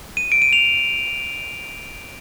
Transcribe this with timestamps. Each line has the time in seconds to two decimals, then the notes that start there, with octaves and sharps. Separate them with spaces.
0.17 D#7
0.32 D7
0.42 D#7
0.53 F7